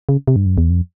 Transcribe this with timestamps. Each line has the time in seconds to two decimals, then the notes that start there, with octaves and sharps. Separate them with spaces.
0.09 C#3
0.27 C3
0.36 G2
0.46 F#2
0.58 E2
0.70 F2